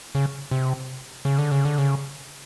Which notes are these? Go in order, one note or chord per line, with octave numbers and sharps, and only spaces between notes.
C#3
C3
C#3
D3
C#3
D3
C#3